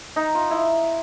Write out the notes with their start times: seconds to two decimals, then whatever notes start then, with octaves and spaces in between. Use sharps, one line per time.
0.16 D#4
0.35 F4
0.51 E4